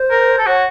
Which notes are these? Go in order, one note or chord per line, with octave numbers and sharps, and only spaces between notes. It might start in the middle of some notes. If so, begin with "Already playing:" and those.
Already playing: C5
A#4
A4
F#4 C#5